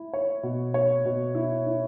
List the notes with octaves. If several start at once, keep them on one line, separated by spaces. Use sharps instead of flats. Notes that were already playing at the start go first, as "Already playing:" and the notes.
Already playing: E4
C#5
B2
C#5
B2
E4
E4